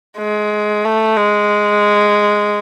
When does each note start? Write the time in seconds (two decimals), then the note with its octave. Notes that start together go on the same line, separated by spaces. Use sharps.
0.18 G#3
0.85 A3
1.17 G#3